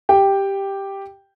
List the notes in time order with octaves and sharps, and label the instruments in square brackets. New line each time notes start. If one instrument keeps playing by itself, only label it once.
[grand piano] G4 G5